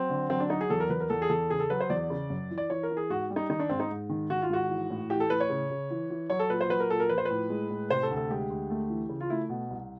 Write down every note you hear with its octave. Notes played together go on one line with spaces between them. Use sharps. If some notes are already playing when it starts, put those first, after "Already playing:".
Already playing: F#3 C4
D3
F#3 C4
D4
F#3 D#4
G#4
E2 A4
A#4
E2 B4
A#4
E2 A4
G#4
E2 A4
C#3 G#4
A4
F#3 B4
C5
E2 D5
C#3
F#2
E3
D5
E3 C#5
A#4
E3
G#4
G#2 F#4
G3
D#4
D#3 D#4
D4
G#2 C4
D#4
G#2
D#3
D#3 F#4
F4
G#2 F#4
E3
A2
E3 G4
A4
A2 B4
C#5
C#3
C#3
E3
E3
F#3 C#5
A4
A#2 B4
C5
F#3 B4
A#4
A#2 A4
A#4
F3 B4
C5
B4
A2
G#3
A2
C3 C5
A4
D2
A4
G#3 G4
D2
A3
E3
C#3
F4
A3 E4
B2
C2